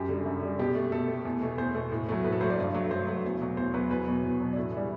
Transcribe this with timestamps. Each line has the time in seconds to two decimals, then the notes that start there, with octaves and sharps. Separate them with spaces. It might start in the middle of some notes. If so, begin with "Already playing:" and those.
Already playing: F#2 G4
0.09 D3 G3
0.26 F#2
0.42 D3 G3
0.59 B2 G4
0.75 A3
0.92 B2 A4
1.08 A3
1.25 E2
1.42 B2 A3
1.58 E2 C5
1.75 B2 A3
1.91 A2
2.09 F#3 A3
2.24 A2 B4
2.32 A4
2.41 F#3 A3 C5
2.50 D5
2.58 G2
2.74 F#3 A3
2.91 G2 C5
3.07 F#3 A3
3.25 E2
3.41 B2 F#3
3.57 E2 C5
3.74 B2 F#3 B4
3.90 E2 B4
4.06 B2 F#3
4.23 E2
4.40 B2 F#3
4.53 D4
4.56 A2 E4
4.73 E3 G3